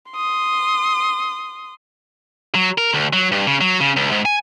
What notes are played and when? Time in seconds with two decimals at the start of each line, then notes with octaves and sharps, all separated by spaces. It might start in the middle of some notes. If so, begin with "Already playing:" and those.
0.12 C6 D#6
2.55 F#3
2.78 A#4
2.94 D2
3.13 F#3
3.32 G2
3.47 C#3
3.61 F#3
3.81 C#3
3.96 C#2
4.11 G#2
4.25 G#5